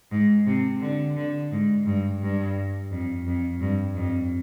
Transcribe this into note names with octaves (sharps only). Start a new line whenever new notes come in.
G#2
C3
D3
D3
G#2
G2
G2
F2
F2
G2
F2